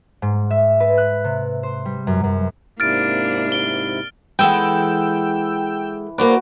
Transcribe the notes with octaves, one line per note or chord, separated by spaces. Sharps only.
G#2
E5
B4
F#6
C3
C5
G3
F#2
F#2
G#2 C3 A#3 D4 E4 F6 A6 D7
D7 G7
E3 G#3 A4 F#5 G5 E6
A#3 F#4 B4 C5 D5